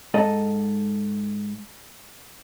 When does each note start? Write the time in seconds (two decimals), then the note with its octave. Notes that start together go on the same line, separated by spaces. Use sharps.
0.14 G#2 A4 D#5